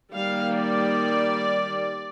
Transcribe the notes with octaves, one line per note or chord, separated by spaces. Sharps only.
D#3 G3 A#3 F5
D5